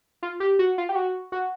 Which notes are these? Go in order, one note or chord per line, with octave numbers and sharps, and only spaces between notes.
F4
G4
F#4
F4
G4
F#4
F#4